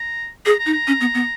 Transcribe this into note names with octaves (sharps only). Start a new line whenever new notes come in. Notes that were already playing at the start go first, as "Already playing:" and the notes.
Already playing: A#5
G#4 A#5
A#5
D#4
A#5
C#4
B3
B3